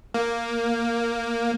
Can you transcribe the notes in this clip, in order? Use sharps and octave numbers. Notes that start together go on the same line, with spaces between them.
A#3